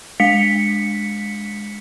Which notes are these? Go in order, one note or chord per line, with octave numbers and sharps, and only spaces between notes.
G#3 B6 C#7